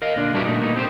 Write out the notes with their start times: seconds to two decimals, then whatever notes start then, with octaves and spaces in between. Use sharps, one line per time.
0.02 A#4 D#5 F5
0.16 A#2 D3 D4
0.34 G3 D4 E4 F#4 G4 B4
0.45 A#2 A3 D#4
0.61 A#3 B3 D#4
0.76 C4 G4 G#4 C5